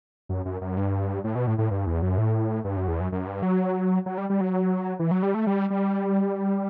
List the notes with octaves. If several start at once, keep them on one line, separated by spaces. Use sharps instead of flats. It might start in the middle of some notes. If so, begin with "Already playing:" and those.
F#2
F#2
F#2
G2
A2
B2
A2
A2
G2
E2
F#2
A2
G2
F#2
E2
F#2
F#2
G2
F#3
F#3
G3
G3
F#3
E3
F#3
G3
A3
G3
G3